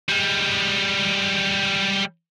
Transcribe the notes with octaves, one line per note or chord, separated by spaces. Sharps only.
G3 G#3